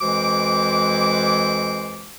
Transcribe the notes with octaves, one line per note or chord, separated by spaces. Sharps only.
F2 E3 G#3 F#4 C5 D6